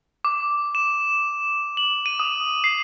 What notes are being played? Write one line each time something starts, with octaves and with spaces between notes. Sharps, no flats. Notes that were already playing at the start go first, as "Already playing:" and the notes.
D6
E7
F#7
D#7
D#6
C7